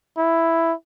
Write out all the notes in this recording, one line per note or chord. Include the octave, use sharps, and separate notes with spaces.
E4